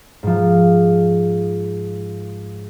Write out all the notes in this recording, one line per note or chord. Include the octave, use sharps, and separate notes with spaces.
G#2 F3